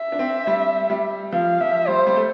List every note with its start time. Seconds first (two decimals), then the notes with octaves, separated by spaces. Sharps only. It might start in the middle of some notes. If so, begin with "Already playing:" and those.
Already playing: E5
0.12 D4
0.19 C4
0.47 G3
0.90 G3
1.32 F3 F5
1.61 F3 E5
1.88 G3 C5
2.07 G3
2.16 A3